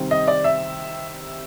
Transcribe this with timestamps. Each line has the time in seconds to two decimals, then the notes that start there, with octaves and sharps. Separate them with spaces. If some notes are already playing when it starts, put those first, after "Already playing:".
Already playing: C3 D#3 G3 C4
0.11 D#5
0.28 D5
0.44 E5